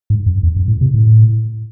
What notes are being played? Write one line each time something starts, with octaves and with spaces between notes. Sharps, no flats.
G#2
F#2
E2
F#2
A2
C3
A2